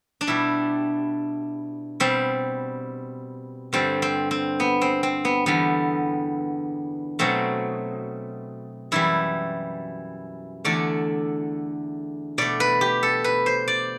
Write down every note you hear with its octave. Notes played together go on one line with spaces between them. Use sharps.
D4
B2 G3 E4
B2 G3 C4
G2 D3 G3 C4
C4
C4
B3
C4
C4
B3
E2 D3 G3 B3
B2 F#3 A3 C4
F#2 E3 G3 E4
E2 D3 A3 D5
B2 A3 D5
B4
G4
A4
B4
C5
D5